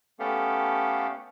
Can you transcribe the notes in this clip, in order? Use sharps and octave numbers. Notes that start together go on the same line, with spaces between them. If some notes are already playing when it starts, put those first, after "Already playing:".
A3 B3 C#4 G4 A4 F5